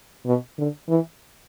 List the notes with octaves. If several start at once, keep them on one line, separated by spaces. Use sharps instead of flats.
B2
D3
E3